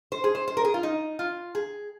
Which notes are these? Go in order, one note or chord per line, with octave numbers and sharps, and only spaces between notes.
C5
G#4
C5
C5
A#4
G#4
F4
D#4
F4
G#4